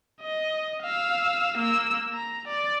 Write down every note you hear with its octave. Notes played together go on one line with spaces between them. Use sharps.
D#5
F5 E6
A#3 E6
A#5
D5